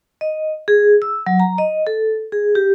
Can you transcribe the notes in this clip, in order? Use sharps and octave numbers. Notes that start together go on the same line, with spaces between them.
D#5
G#4
E6
F#3
A#5
D#5
A4
G#4
G4